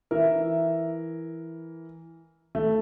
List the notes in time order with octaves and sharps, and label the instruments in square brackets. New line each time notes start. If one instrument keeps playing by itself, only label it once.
[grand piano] E3 A#4 [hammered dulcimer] E5
[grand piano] A3